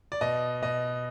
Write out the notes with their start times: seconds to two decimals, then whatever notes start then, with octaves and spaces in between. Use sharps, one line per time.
0.12 D5
0.21 B2 D#5
0.62 B2 D#5